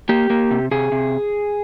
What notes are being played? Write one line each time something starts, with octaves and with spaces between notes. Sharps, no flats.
A#3 G4
A#3
C3
C3 G#4
C3